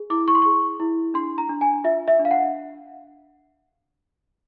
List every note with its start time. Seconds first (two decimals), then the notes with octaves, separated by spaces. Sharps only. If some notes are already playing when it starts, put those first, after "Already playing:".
Already playing: G#4
0.10 E4 D6
0.28 C#6
0.35 C6
0.42 G#4 C#6
0.80 E4
1.14 D4 C6
1.38 A#5
1.49 D4
1.61 G#5
1.84 F4 E5
2.08 E5
2.19 D4
2.25 F5
2.31 F#5